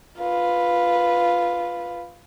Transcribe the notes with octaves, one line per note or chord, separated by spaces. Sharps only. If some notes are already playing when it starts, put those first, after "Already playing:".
F4 B4